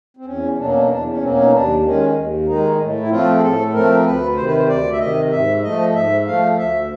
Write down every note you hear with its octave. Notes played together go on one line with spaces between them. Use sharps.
C4
E2 C#4
B2 F#3 A#3 D4
C#4
D4
E2 D4
C#4
B2 F#3 A#3 C4
C#4
D#4
D#2 D4
D#3 G#3 C#4
D#2
D#3 G#3 D#4
A2
E4
F3 A3 C4 F4
G#4
A2 A4
F3 A3 C4 A#4
D2 B4
C3 D#3 C5
B4
C5
D2 D5
E5
C3 D#3 D#5
G#2 E5
F3 A3 D#5
G#2 E5
F3 A3 F5
D2 E5